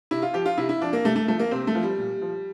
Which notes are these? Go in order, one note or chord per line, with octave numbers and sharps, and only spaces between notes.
C3 E4
F4
F3 G4
F4
C3 E4
E4
F3 D4
A#3
C3 A3
A3
F3 A3
A#3
C3 C4
A3
F3
G3
A#2
F3